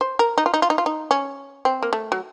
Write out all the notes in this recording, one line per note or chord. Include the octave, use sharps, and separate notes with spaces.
C5
A#4
D#4
F4
D#4
F4
D#4
F4
D#4
C#4
C4
A#3
A3
F#3